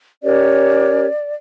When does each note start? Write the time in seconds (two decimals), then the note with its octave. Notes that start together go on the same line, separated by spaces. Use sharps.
0.22 C#4 G4 A#4 C#5 D5